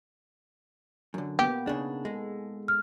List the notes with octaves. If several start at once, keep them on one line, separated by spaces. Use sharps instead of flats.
F#2 D3
A#3 B3 G4
C#3 D4 D#4 G#4
G#3 A4
F6